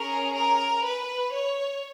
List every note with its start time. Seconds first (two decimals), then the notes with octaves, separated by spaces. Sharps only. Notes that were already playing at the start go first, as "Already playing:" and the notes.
Already playing: C#4 G#4 A#4
0.35 A#4
0.84 B4
1.33 C#5